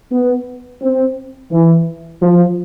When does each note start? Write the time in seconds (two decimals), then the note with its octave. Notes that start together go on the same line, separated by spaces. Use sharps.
0.11 B3
0.82 C4
1.51 E3
2.22 F3